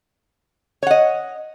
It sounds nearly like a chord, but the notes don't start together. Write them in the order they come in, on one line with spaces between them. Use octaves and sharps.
C#5 F#5 D#5